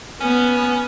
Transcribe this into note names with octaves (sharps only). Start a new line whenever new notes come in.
B3 C#4